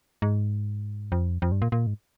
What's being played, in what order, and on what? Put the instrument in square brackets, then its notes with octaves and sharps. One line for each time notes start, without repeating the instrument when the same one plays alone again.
[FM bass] G#2
F2
F2
G2
A#2
A#2
G#2